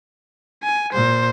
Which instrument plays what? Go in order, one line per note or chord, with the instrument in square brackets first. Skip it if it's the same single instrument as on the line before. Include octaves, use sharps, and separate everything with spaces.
[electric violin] G#5
[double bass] A#2 [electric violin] C5